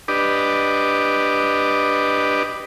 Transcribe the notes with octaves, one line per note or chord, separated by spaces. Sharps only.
D4 G4 B4 D5 D#5